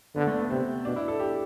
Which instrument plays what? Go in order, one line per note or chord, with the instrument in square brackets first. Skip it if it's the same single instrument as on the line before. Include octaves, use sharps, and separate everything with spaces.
[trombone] D3 [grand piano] B3
[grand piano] A3
B3
[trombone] C3 [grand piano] C4
[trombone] B2 [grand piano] D4
[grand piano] E4
A4
G4